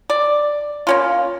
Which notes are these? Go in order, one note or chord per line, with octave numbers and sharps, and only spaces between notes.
D5
A#3 C#4 F4